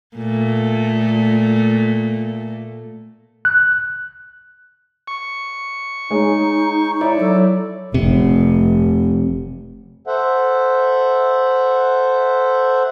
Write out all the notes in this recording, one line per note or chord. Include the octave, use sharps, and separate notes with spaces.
A#2 A3
F#6
C#6
G#3 D#4 G#4 C#5
E4 C#5 D5
F#3 A4
F1 C3
A4 C5 E5 F#5